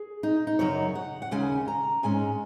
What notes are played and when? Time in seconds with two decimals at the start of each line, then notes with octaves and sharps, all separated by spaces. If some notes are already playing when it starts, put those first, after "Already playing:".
Already playing: G#4
0.23 D#4
0.47 D#4
0.59 F#2 C#3 F#3 D#4 C#5
0.95 F#5
1.22 F#5
1.31 D#2 C#3 G#3 C#4 G#5
1.68 A#5
2.03 G#2 G#3 C#4 G#5